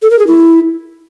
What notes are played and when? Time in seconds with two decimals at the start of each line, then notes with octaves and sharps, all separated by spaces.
0.02 A4
0.11 A#4
0.19 G#4
0.27 E4